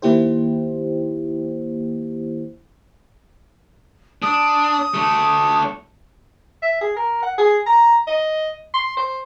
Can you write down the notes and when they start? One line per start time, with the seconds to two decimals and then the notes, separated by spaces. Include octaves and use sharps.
0.02 D#3 A#3 E4 G4 C5
4.22 D4 D#6
4.94 A3 D4
6.62 E5
6.81 G#4
6.96 A#4
7.22 F#5
7.38 G#4
7.66 A#5
8.07 D#5
8.74 C6
8.97 C5